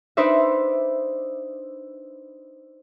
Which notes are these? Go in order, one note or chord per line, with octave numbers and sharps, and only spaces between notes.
D4 D#4 B4 C5 D5 E5